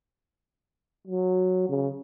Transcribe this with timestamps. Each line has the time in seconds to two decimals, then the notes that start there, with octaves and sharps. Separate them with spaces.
1.08 F#3
1.69 C#3